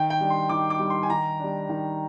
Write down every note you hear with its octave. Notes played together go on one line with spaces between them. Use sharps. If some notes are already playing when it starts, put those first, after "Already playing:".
Already playing: D#3 G5
G5
G3 D4
C6
D#3 D6
D6
G3 D4
C6
G#5
D#3 A#5
G3 D4
D#3